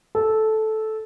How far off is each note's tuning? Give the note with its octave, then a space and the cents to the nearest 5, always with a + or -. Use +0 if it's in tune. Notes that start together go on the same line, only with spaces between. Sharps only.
A4 -10